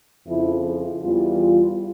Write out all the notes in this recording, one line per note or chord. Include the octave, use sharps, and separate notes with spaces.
F2 C#3 F3 E4
E2 E3 G3 F4